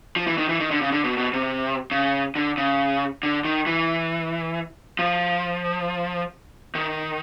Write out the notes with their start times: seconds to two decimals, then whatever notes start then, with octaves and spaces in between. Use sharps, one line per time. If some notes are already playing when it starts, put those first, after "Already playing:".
0.16 F3
0.27 E3
0.38 D#3
0.49 E3
0.60 D#3
0.71 D3
0.82 C#3
0.92 D3
1.04 B2
1.18 B2
1.33 C3
1.91 C#3
2.36 D3
2.58 C#3
3.23 D3
3.45 D#3
3.66 E3
4.99 F3
6.75 D#3